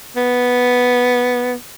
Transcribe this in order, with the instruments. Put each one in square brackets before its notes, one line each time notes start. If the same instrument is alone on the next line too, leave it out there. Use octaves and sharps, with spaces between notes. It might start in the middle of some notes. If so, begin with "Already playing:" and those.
[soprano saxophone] B3